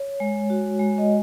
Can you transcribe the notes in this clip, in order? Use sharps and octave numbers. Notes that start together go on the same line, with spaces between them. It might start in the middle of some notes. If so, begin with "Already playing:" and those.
Already playing: C#5
G#3
F#4
G#3
D#5